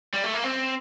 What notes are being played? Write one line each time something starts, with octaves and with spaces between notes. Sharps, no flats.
G3
A3
A#3
C4